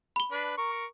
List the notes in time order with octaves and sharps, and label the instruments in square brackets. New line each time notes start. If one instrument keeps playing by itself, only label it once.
[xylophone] B5 G7
[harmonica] D4 B4
A#4 C#6